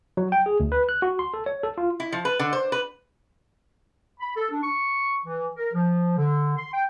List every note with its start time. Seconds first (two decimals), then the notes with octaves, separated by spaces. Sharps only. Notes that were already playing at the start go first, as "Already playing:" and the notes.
0.17 F#3
0.32 G5
0.46 G#4
0.60 D2
0.72 B4
0.89 F#6
1.02 F#4
1.19 C6
1.34 A4
1.46 C#5
1.63 A4
1.78 F4
2.00 E4
2.12 F3
2.25 B4
2.39 D3
2.53 C5
2.72 B4
4.19 B5
4.36 A4
4.50 D4
4.63 C#6
5.25 E3
5.56 A#4
5.73 F3
6.17 D3
6.57 C6
6.73 G5